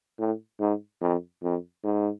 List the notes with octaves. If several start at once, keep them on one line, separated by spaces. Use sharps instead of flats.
A2
G#2
F2
F2
G#2